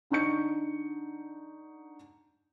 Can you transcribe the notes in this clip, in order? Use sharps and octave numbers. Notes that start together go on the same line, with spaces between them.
D3 D#4 C#6 G6 C#7